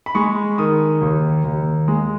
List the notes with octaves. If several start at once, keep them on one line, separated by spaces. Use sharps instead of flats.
B5
G#3 C#6
D#3 D#6
D#2
D#2
G#3